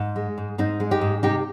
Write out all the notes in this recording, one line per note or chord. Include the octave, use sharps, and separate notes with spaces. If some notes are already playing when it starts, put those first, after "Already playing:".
Already playing: G#2
G#3
G#2
G#2 C4 D#4
G#3
D#4 G4
G#2
C3 D#4 G4